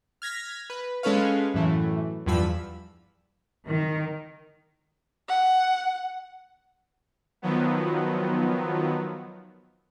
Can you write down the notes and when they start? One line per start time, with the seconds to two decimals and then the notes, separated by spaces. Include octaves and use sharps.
0.22 F6 G#6 A#6 B6
0.70 B4
1.03 G#3 C#4 A4 B4 C#5 F5
1.54 F#2 A2 E3 A3
2.26 E2 G2 F3 B5 E6
3.66 D#3
5.28 F#5
7.42 D#3 F3 F#3 B3